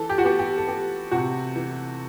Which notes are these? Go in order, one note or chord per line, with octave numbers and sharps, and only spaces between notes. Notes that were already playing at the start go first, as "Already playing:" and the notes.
Already playing: E3 A4
G4
F#4
B3 G4
G4
A4
B3 G4
C3 F#4
E3